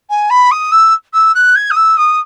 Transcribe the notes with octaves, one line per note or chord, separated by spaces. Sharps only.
G#5
B5
D#6
E6
E6
F#6
G#6
D#6
E6
D#6